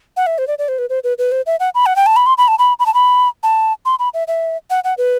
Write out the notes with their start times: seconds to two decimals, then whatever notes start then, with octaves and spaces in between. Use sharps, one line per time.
0.17 F#5
0.27 E5
0.38 C5
0.47 D5
0.59 D5
0.68 C5
0.79 B4
0.90 C5
1.04 B4
1.18 B4
1.32 C5
1.46 E5
1.60 F#5
1.75 B5
1.86 F#5
1.96 G5
2.06 A5
2.16 B5
2.26 C6
2.38 B5
2.48 A5
2.59 B5
2.79 B5
2.86 A5
2.94 B5
3.43 A5
3.85 C6
3.99 B5
4.14 E5
4.28 E5
4.70 F#5
4.84 F#5
4.98 B4